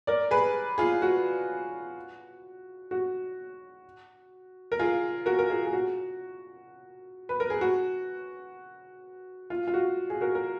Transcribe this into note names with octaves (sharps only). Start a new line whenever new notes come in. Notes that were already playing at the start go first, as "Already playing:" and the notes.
A#4 D5
G#4 B4
F4 G#4
F#4
F#4
A#4
F4 G#4
F#4 A#4
A#4
F4 G#4
G#4
F#4
B4
A#4
G#4
F#4
F4
F4
F#4
G#4
F#4 A#4
A#4